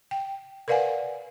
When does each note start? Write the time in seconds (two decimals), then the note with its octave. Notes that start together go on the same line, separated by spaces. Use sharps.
0.11 G5
0.68 A#4 B4 D5 F5 F#5 G#5